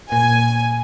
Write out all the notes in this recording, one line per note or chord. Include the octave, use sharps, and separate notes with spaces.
A#2 G#5